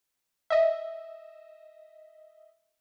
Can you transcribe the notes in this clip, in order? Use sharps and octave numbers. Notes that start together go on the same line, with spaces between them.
D#5 E5